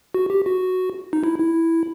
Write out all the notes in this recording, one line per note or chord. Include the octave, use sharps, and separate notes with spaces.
F#4
G4
F#4
D#4
E4
E4